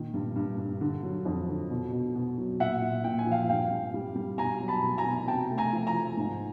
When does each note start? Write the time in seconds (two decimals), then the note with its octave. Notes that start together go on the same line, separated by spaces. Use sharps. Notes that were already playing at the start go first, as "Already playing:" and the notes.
Already playing: A#2 D#3
0.14 G2
0.36 G2
0.58 G2
0.81 D3
1.03 F#3
1.25 F2
1.49 D3
1.70 B2
1.92 B2
2.15 B2
2.38 F#3
2.60 A#2 E5 F#5
2.82 A#2
3.04 A#2 G5
3.18 G#5
3.26 F3
3.32 F5 G5
3.49 G2 F5 G5
3.71 G2
3.94 G3
4.16 G3
4.38 B2 G#5 A#5
4.60 F#3
4.68 A5 B5
4.83 B2
4.98 G#5 A#5
5.05 B2
5.27 C3 G5 A5
5.51 A3
5.58 G#5 A#5
5.73 F3
5.87 G#5 A#5
5.94 F3
6.17 G#2